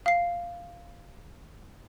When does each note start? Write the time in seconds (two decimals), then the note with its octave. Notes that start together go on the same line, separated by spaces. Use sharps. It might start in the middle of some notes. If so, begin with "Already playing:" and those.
0.06 F5 C7